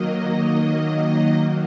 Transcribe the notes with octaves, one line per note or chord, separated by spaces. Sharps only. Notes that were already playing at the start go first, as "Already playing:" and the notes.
Already playing: D#3 F#3 A#3 D#5
D#3 F#3 A#3